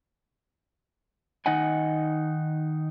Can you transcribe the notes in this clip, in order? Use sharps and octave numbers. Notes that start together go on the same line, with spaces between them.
D#3 D#4 D#5 F#5 G#5